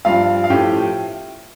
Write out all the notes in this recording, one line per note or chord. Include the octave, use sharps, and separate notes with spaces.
G2 F3 F4 F5
F5
A2 F3 G4 G5